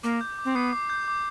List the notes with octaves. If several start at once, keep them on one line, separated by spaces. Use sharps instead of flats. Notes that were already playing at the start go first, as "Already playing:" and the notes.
A#3 D6
G6
D6
C4
B3 C7
D6
G6
D6